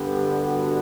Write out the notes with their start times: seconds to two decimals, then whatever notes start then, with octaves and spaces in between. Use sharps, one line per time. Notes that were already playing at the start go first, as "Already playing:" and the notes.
Already playing: G2 D3 G3 B3 G4
0.45 F#4